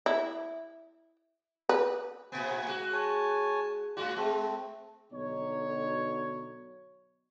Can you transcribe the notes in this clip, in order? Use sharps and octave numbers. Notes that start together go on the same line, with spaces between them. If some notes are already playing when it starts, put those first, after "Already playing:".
E4
B4
A2 C3 B3 G#5
G#3 F#4
C#5 G#5 A5
A2 G#3 F4 F#4 D5
G#3 A3 C4
B1 B2 D3 D#4 F#4 C#5